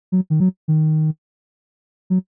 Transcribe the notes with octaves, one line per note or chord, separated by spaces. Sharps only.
F#3
D#3
F#3
D#3
F#3